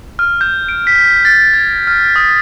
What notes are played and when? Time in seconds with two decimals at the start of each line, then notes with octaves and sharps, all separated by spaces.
0.19 F6
0.41 G6
0.69 D7
0.87 B6
1.25 A6
1.53 G#6
1.87 F6
2.16 D#6